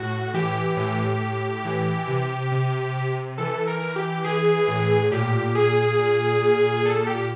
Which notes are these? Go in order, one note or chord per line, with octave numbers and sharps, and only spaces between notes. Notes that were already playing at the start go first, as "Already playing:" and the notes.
Already playing: A2 F#4
E3 G4
A2 G4
A2
E3
C3
C3
C3
E3 A4
A#4
E3
G4
E3 G#4
A2
A#2 G4
A#2 G#4
A#2
A#2
G#4
A#2 A4
G4